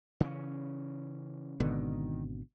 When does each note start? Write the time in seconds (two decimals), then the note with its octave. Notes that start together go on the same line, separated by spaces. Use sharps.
0.20 C#3 E3 C#4
1.60 G#1 B2 D3 D#3